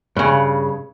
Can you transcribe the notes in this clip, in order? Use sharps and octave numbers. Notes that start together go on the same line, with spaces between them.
G2 C#3